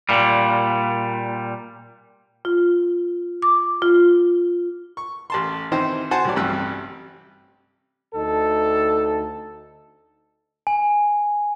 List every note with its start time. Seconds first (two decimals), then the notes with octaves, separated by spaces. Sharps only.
0.09 A#2 G3
2.45 F4
3.42 D6
3.82 F4
4.97 C#6
5.30 A1 A5 C6
5.72 D#3 E3 C4 D#4 C5
6.11 F#4 C5 F#5 G#5 A5
6.25 C2 F#3 D5
6.36 A1 G2 C3 G3 E6 F#6
8.15 D2 D#4 A4
10.67 G#5